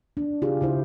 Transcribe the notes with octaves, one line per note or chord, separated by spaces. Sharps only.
D4
C#3 F4 G4 G#4
C#3 E4 C5